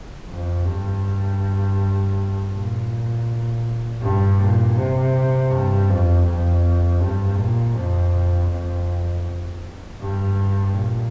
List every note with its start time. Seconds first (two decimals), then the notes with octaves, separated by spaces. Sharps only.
0.28 F2
0.65 G2
2.52 A#2
4.02 G2
4.39 A#2
4.77 C3
5.51 G2
5.89 F2
6.25 F2
7.00 G2
7.38 A#2
7.76 F2
8.50 F2
10.00 G2
10.74 A#2